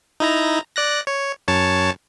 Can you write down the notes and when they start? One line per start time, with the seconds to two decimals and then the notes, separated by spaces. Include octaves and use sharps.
0.20 D#4 E4 A#5
0.76 D5 F#6 A#6
1.07 C#5
1.48 F#2 C#5 A5